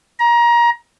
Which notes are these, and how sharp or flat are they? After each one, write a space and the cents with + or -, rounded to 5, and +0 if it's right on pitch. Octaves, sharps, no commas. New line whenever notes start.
A#5 +25